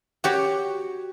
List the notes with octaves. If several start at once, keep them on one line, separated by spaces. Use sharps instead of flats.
F#4 G4 C#5